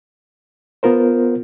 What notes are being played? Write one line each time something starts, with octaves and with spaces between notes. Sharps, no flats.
B3 F4 A#4 C5